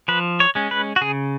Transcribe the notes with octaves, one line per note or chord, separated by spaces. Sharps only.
F3 B4
C#5
G#3 C#4
B4
F#4
C#3 G#4